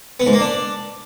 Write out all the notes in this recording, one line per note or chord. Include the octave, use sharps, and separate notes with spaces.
B3
G#2
A#3
D4